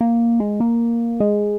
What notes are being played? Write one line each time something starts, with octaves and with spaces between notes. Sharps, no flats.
A#3
G#3
A#3
G#3